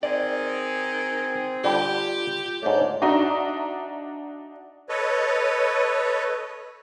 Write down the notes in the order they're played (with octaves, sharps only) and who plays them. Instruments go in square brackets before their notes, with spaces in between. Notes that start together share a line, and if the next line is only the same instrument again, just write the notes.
[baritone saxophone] D#3 [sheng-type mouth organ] C4 G#4 [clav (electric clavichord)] D5
[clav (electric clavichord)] D3 G3 [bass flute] F4 [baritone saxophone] G4
[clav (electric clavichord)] G#2 A3 [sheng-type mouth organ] D4 D5 G6 [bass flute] C#5
[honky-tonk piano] D4 D#4 F#4 E5 A#5
[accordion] A4 B4 C#5 D#5